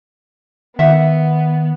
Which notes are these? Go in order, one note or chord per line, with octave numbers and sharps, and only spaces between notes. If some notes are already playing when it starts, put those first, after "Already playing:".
D#3 B3 E5 F#5